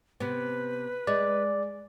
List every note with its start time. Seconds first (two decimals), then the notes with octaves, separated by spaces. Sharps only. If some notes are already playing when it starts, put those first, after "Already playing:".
0.20 C3 B3 B4
1.07 G#3 D5